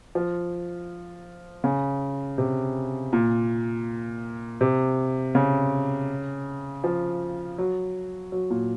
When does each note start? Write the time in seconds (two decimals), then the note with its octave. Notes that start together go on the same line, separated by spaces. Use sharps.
0.15 F3
1.64 C#3
2.38 C3
3.13 A#2
4.61 C3
5.35 C#3
6.84 F3
7.58 F#3
8.32 F#3
8.50 A#2